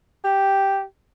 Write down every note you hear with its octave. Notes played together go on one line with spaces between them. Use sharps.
G4